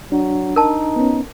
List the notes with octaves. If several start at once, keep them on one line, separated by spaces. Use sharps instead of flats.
F#3 D4
D#4 A#4 A5
B3 C#4